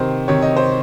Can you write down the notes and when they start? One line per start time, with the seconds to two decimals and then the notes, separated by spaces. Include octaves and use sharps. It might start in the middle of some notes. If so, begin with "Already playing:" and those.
Already playing: C3 D#3 C5
0.28 C3 D#3 C#5
0.42 D#5
0.57 C5